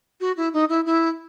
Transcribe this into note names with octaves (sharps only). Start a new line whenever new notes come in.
F#4
E4
D#4
E4
E4